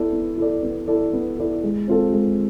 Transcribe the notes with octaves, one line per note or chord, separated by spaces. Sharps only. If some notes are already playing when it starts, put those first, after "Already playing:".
Already playing: B3 E4 A4 D5
B3
E4 A4 D5
B3
E4 A4 D5
B3
E4 A4 D5
G#3
C4 F4 A4
G#3